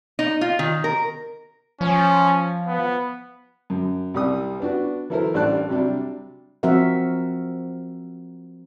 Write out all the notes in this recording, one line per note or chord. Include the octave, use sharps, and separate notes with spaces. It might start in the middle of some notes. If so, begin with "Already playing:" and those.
D#4
F4
D#3
A#4
F3 C#4
B3
F#2
C2 G3 D#6
B3 D4 F#4
E3 F#3 E4 A4 A#4 C5
A1 G3 D4 D5 A5 F#6
C3 F#3 G3 D4
F3 C4 F#4 A#4 E5 F#5